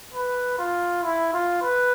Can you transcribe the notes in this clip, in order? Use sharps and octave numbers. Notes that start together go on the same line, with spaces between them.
B4
F4
E4
F4
B4